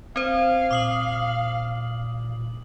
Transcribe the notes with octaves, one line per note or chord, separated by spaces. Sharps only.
C4 C5 F5
A#2 D6 D#6 F#7